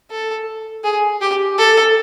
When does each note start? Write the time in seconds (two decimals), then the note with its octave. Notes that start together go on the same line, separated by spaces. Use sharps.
0.10 A4
0.84 G#4
1.21 G4
1.58 A4